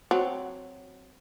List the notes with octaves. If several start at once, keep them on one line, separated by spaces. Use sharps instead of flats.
F#3 C4